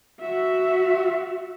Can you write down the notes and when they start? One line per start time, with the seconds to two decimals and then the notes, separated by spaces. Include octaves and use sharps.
0.21 F#4 E5